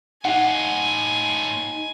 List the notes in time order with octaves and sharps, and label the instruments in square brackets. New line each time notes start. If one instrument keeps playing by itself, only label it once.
[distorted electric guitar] A2 F4 [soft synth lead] D#4 [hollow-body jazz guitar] F#5 [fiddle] G#5